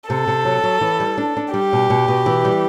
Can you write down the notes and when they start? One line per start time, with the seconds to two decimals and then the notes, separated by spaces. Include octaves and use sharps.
0.09 C3 A4
0.27 C3
0.45 F#3
0.64 F#3
0.81 E3
1.00 G3
1.18 D4
1.37 D4
1.54 G3 G4
1.73 B2
1.90 B2
2.08 B2
2.26 E3
2.45 G3